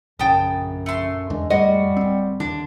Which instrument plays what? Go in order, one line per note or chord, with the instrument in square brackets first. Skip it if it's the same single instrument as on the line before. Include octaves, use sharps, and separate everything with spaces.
[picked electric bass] A#1 C#3 [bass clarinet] F#2 [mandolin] G5 A5 D#6
[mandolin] A3 C6
[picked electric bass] E2 D3 [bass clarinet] G#3
[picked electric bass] F2 A2 G#3 [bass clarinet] G3 [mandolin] F#4 [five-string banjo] D#5
[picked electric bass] D1 C4
[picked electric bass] D#2 D3 [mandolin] D4